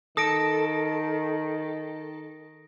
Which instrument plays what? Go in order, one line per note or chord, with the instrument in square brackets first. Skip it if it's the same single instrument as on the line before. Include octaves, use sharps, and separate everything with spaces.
[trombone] D#3 [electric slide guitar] A4 [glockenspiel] D#6 A#6 D7